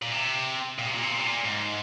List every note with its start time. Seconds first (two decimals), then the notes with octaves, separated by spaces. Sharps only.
0.02 A#2
0.12 C3
0.78 A#2
0.86 C3
0.94 A#2
1.03 C3
1.12 A#2
1.20 C3
1.27 A#2
1.45 G#2